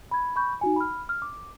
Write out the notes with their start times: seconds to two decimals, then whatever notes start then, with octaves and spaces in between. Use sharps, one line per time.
0.11 B5 G#6
0.36 B5 C#6 G6
0.61 D#4 F#4 G#5
0.76 B5 F6
1.09 F6
1.22 D6